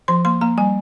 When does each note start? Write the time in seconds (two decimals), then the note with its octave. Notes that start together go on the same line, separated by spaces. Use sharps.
0.08 F3 C6
0.25 A#3 C6
0.41 A#3 A#5
0.58 G3 G#5